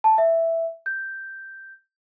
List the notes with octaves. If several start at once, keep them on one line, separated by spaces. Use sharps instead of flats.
A5
E5
G6